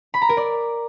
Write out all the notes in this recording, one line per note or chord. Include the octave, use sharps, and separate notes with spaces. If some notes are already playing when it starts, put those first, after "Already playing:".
B5
A#5
A#4
D5